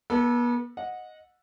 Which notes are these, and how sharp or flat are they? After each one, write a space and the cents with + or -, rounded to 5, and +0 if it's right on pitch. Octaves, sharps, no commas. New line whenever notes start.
B3 -40 A4 +0
D#5 +0 F#5 -20